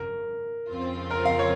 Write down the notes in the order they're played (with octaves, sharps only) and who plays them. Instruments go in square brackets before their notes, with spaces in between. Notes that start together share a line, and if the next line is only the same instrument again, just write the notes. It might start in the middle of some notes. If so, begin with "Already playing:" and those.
Already playing: [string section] G#1 F#2 C#3 [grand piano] A#4
[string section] F2 C#3 F3 C4 F4
[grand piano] A#4
F5
C#5